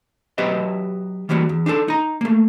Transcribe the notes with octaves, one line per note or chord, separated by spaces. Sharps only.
F#3 B3 G4 B4 D#5 E5
E3 G3 A#3 F4 F#4
E2
D4 D#4 G4 A4
D#4 A#5
A3 A#3